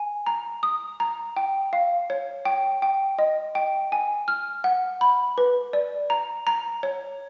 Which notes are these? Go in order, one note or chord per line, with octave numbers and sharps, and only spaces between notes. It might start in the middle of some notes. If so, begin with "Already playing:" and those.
Already playing: G#5
A#5
D#6
A#5
G5
F5
C#5
G5
G5
D#5
G5
G#5
F6
F#5
B5
B4
D5
A#5
A#5
C#5